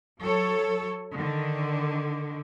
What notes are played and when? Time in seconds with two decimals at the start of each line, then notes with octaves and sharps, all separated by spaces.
0.19 F#3 A4 C#5
1.15 D3 D#3